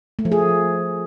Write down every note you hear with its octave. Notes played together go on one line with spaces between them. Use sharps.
A3
F3
G#4